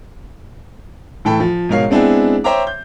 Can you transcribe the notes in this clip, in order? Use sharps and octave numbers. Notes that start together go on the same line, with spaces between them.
A2 E3 A4 G5 B5
F3
G#2 B2 A#4 C#5 F5 C7
G#3 B3 C4 D4 E4 G#4
C5 C#5 E5 G5 A#5 D6
G6